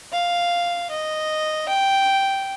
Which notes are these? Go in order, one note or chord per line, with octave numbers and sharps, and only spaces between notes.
F5
D#5
G5